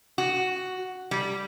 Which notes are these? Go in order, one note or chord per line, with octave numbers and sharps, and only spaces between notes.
F#4
G3